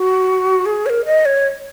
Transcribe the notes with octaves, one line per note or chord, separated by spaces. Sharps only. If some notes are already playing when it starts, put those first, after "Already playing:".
Already playing: F#4
G#4
C#5
A#4
D#5
C#5